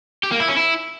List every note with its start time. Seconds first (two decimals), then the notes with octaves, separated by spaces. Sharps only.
0.23 G4
0.32 A#3
0.40 E4
0.48 C#4
0.57 E4